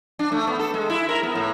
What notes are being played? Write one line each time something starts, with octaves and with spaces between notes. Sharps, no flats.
D4
A3
B3
A4
G#3
E4
A#4
B3
A2